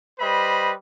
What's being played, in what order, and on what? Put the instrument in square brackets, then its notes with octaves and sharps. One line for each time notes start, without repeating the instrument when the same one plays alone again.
[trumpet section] G3 B4 C5 D#5 B5